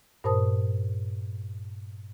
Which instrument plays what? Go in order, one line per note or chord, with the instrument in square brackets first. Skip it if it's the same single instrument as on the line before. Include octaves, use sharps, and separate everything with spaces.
[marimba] G2 A#2 A#4 C5 A5 D#6